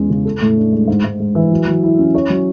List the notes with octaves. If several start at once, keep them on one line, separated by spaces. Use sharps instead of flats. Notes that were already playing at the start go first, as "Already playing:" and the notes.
Already playing: E2 G#3 C#4
C#3
A4
A2
D4
G#3
G#2
G#2
G#3
E3
F#3
F#3
E4
C#4
C#5
F#3